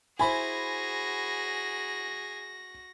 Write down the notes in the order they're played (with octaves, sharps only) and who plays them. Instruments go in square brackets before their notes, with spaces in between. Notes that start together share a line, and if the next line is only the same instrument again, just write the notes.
[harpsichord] E4 C5 [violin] F#4 A#6 [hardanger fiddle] G#4 [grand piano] G#5 B5